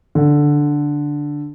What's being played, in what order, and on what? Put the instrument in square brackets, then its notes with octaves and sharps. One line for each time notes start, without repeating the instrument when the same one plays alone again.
[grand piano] D3